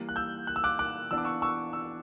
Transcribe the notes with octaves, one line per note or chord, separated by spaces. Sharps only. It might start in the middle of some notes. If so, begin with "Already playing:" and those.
Already playing: E3 G3 A#3
F#6
E6 G6
F#6
E6
D6 F#6
D6 F#6
E3 B3 D4 E6
D6
C#6 E6
C#6 E6
C#6 E6